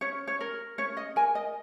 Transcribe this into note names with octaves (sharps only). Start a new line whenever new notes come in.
C#4 C#5
C#5
A#4
C#4 C#5
D#5
A#4 G#5
D#5